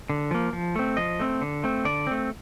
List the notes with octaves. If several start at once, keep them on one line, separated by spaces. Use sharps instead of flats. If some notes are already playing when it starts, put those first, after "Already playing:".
D3
F3 A#3
F3
A3 C4
F3 D#5
A3 C4
D3
A3 C4
D3 D5
A3 C4